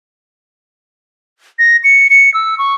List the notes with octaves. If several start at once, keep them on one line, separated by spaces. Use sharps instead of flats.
A#6
C#7
C#7
E6
C#6